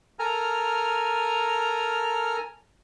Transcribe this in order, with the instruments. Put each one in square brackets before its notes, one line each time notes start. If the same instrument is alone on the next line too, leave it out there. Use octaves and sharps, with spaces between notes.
[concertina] A4 A#4 G#5 A#5 F6